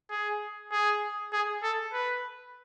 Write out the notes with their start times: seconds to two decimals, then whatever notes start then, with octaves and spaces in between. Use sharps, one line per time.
0.11 G#4
0.72 G#4
1.33 G#4
1.63 A4
1.94 B4